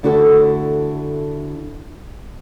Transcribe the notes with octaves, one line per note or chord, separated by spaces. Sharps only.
D2 D3 E4 F#4 G4 A4